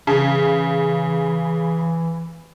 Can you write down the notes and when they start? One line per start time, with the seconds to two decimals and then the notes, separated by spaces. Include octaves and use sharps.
0.07 C#3 E3